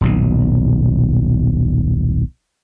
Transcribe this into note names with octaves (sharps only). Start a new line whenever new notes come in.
D#1 B1 B2